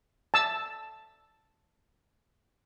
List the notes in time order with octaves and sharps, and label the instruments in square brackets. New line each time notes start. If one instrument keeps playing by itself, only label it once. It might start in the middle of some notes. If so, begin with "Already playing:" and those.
[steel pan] A5 E6